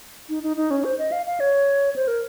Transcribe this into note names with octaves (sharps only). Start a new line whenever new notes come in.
D#4
D#4
D#4
C#4
C5
D#5
F5
F5
C#5
C5
A#4